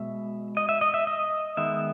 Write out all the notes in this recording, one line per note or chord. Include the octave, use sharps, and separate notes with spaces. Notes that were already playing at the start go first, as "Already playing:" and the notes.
Already playing: B2 G#3 E5
D#5
E5
D#5
E5
D#5
D#3 G#3 B3 E5